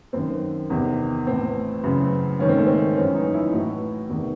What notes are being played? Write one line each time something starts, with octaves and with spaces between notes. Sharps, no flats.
F#2 D#3 C4
E2 C3 D#3
A2 E3 C4
F#2 C#3 E3
G#2 D#3 C#4
C4
A3
C4
F#2 E3 C#4
D#4
E4
A2 E3 F#4
E2 C3 D#3